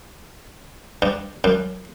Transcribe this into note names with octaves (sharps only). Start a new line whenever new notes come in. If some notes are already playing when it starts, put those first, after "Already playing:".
G2
F#2